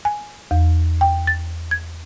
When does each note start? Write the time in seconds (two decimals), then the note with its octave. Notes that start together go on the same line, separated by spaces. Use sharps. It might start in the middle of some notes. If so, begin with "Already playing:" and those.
0.05 G#5
0.51 E2
1.01 G5
1.27 A6
1.71 G#6